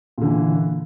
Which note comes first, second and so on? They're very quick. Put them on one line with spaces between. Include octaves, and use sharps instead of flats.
A#2 D3 E3